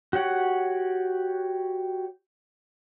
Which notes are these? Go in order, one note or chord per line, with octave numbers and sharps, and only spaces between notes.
F#4 G4 C#5 F#5